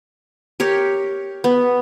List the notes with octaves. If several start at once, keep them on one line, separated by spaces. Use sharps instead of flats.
G4 A#4 C#5
B3